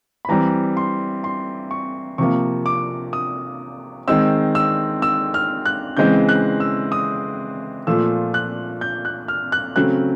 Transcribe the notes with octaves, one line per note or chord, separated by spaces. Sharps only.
B5
E3 G3 C4 A#5
C6
C6
C#6
C3 F3 A#3 C#6
D6
D#6
D#3 G#3 C4 E6
E6
E6
F6
F#6
C#3 E3 G#3 C4 G6
F#6
E6
D#6
A#2 F3 A3 E6
F#6
G6
F#6
F6
F#6
C#3 F#3 A3 C4 F#6